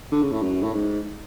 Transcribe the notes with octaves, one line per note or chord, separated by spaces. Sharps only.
D3
C#3
A2
F#2
A2
G#2